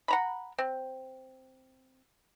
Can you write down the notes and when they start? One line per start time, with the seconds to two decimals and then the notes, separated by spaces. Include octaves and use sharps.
0.08 F#5 A#5 B5
0.58 C4